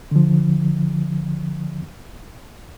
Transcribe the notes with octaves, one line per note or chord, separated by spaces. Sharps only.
D3 F3